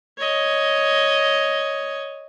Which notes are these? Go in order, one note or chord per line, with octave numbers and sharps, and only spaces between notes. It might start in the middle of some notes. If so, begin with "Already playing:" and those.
C#5 D#5